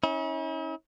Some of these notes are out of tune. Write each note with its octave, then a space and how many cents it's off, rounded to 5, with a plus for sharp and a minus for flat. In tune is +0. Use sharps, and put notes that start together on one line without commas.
C#4 -10 E4 -45